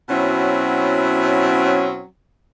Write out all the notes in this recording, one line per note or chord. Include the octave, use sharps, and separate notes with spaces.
B2 F#3 C4 C#4 E4